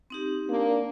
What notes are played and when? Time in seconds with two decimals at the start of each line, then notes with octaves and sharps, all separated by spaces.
0.10 C4 D#4 G4
0.49 A#3 D4